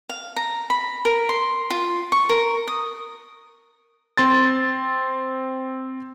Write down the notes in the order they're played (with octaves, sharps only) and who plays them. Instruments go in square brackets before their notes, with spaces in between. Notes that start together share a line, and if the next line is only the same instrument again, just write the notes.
[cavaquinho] F5
A#5
B5
A#4
C6
F4
C#6
A#4
D#6
[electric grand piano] C4 C6 A6